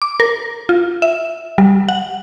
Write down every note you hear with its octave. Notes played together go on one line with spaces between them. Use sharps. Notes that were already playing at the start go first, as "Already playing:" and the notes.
D6
A#4
F4
E5
G3
F#5